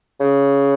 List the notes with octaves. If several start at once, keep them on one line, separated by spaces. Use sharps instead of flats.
C#3